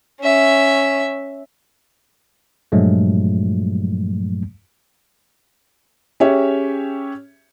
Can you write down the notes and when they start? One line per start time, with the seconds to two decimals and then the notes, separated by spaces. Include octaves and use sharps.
0.20 C#4 E5
2.72 G2 A#2 F3 F#3 G#3 A3
6.20 C#4 G4 G#4 C#5 E5